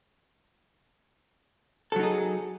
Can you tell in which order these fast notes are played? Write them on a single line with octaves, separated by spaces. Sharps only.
A4 F#3 D#4 G#4